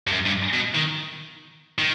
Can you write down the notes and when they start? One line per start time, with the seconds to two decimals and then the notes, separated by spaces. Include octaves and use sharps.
0.07 G2
0.12 F#2
0.26 G2
0.54 B2
0.75 D#3
1.79 D#3